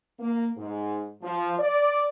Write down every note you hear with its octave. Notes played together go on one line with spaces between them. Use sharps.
A#3
G#2
F3
D5